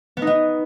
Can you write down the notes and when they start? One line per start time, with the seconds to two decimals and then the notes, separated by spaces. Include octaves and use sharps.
0.17 B3
0.22 D#4
0.27 B3